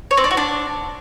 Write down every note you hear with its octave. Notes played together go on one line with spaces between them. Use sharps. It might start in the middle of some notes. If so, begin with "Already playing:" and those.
C#5
C4
D4
F#4
D4